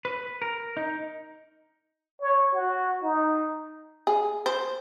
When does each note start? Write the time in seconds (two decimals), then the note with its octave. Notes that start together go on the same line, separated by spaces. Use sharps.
0.05 B4
0.42 A#4
0.77 D#4
2.21 C#5
2.54 F#4
3.03 D#4
4.07 G#4
4.46 C5